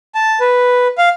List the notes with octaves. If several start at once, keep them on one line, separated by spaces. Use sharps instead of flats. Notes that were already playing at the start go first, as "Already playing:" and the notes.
A5
B4
F5